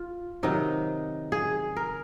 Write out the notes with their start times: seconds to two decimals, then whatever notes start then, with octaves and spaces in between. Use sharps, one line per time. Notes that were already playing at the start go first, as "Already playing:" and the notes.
Already playing: F4
0.43 C3 D#3 F#3 D#4
1.32 G#4
1.76 A#4